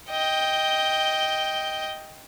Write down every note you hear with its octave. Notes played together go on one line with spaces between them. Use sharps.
D#5 G5